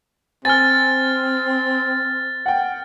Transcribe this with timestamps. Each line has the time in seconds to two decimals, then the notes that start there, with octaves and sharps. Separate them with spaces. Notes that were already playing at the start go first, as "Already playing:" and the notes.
0.45 C4 G#5 F6 A6
2.46 F#5 G5